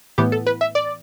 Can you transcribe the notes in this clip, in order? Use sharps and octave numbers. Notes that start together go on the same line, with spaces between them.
A2 E3 B3 G4
A4
B4
E5
D5